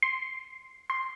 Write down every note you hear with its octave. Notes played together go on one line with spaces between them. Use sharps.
C6
C6